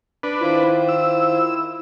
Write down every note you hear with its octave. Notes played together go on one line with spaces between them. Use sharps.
D4 B4
D#3 E4 F4 C5
E6